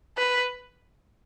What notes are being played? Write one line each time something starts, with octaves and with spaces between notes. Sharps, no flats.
B4